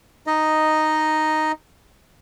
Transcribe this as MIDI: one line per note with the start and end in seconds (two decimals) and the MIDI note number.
0.27 1.52 63
0.27 1.52 75